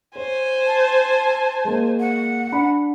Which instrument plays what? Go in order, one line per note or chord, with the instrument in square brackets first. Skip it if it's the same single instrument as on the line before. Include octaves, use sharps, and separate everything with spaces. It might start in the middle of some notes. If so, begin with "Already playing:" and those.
[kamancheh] C5 G#5 [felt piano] C#5
[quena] A5
[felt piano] G#3 A#3
[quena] F#5
[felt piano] D4 B5